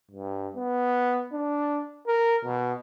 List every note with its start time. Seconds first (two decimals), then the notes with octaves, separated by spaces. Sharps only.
0.11 G2
0.57 B3
1.33 D4
2.07 A#4
2.45 B2